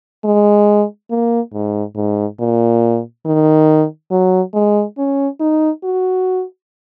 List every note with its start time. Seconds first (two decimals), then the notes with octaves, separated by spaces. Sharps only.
0.25 G#3
1.10 A#3
1.53 G#2
1.96 G#2
2.40 A#2
3.25 D#3
4.11 F#3
4.54 G#3
4.98 C#4
5.40 D#4
5.84 F#4